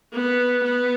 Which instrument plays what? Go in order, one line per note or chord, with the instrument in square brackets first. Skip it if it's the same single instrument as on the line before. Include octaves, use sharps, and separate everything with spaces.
[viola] B3
B3